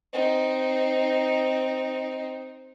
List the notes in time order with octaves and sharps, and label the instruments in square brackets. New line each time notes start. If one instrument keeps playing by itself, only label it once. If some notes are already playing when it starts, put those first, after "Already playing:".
[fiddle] C4 D#4